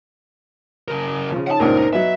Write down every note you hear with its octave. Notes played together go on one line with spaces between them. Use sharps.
C#3 A#4
C#3 F3
D#4 C#5 F#5 A5
C#2 G2 A#2 D#4 A#4 C5
F#3 B3 D#5 E5